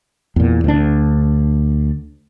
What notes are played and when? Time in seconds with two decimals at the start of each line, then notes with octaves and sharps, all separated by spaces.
0.36 E2 A#2
0.64 D2 D4